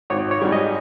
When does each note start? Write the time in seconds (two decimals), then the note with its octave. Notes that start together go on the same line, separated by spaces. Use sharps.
0.10 G#1 C#5
0.31 C#5
0.41 G#2 G3
0.52 D#5